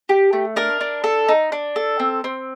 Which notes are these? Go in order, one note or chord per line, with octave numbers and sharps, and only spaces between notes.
G4
A3
D4 A#4
D4
A4
D#4
D4
A4
C4
C4